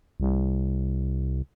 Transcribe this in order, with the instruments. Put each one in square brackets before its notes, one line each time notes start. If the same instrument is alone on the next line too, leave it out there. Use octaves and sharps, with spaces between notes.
[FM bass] C2